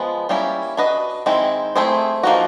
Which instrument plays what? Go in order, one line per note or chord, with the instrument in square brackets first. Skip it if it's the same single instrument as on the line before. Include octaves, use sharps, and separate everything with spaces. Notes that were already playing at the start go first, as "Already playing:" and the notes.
Already playing: [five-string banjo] F3 G#3 B3
G3 A#3 C#4 E4
D4 F#4 B4 D#5
D#3 G#3 C4 E4
A3 C4 E4 G#4 C5
F3 A#3 D#4 F#4